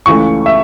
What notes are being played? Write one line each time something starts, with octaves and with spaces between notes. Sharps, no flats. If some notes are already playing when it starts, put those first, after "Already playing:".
C#2 C#3 E3 A3 C#6
E5